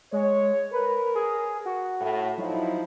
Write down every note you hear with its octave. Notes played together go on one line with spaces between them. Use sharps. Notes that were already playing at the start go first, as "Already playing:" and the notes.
G#3 C#5
A#4 B4
G#4
F#4
A2
F3 F#3 D#4 E4